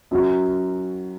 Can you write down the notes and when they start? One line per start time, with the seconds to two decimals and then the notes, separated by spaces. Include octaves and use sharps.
0.11 F#2 F#3 C#4 F#4